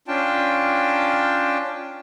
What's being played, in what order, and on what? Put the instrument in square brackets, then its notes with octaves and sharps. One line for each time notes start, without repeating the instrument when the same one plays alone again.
[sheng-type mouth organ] C#4 D4 F4 G5 A5